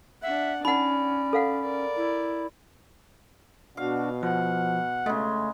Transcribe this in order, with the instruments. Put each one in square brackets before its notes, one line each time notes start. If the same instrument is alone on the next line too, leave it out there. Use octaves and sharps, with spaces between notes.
[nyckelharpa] D4 F#5 [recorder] E5
[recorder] C#4 [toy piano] D#4 F#5 [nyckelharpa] D5 [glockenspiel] B5
[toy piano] A4 F5 F#5
[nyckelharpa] A#4 D5
[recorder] E4
[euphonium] B2 [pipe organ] D4 F#4 [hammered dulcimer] F5
[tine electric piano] F3 [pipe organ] F#5
[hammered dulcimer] C#3 G#3 [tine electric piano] A3